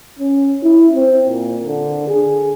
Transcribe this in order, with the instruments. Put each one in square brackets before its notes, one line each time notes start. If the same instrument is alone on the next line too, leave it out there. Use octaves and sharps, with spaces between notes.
[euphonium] C#4
E4
C4
A#2
D3
G#4